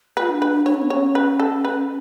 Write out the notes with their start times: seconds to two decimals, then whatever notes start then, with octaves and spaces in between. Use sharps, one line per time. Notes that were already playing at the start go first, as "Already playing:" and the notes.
0.17 F4 B4
0.29 D4
0.42 B4
0.66 D4 C#5
0.74 C#4
0.82 B3
0.90 C#4 C#5
1.15 B4
1.40 A4
1.65 B4